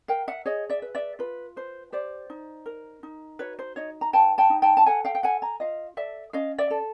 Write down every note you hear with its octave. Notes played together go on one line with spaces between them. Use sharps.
A#4 F5 G5
E5 F#5
G#4 C#5 D#5
D5 E5
B4
D5 E5
F4 B4
B4 C5
G4 C5 D5
D#4
A#4
D#4
F#4 B4 C#5
C5
D#4 C#5 D#5
A#5
B4 G5 A5
G5 A5
D#4
G5 A5
A5
A4 F#5 G#5
F5 G5
G5
A4 F#5 G#5
G#5 A#5
F4 D#5 F5
A4 D5 E5
C#4 D#5 F5
D5 E5
A4